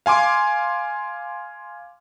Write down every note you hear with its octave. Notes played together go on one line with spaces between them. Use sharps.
F5 G#5 C6 D6